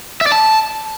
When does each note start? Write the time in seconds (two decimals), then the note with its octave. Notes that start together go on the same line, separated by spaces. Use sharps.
0.21 E5
0.27 D5
0.32 A5